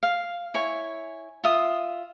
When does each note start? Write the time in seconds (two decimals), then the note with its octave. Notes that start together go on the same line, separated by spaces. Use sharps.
0.03 F5
0.54 E4 C#5 G#5
1.44 F4 E5 D#6